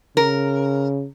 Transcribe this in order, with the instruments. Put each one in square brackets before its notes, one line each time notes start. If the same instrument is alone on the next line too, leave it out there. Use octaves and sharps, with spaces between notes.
[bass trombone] C#3 [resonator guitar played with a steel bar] A#4